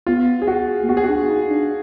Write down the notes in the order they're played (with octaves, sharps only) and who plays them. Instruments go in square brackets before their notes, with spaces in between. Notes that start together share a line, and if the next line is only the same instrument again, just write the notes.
[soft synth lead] B3 [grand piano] F4
[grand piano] G#4
F#4
[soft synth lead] A#3
[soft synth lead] B3 [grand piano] F#4
[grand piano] G#4
[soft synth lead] D4 [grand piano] F#4
[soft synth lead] D#4
D4